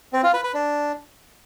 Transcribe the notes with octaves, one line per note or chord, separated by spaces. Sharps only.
C4
F4
B4
B4
D4